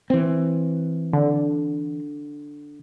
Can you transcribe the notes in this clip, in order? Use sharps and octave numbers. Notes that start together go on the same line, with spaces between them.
E3 C4
D3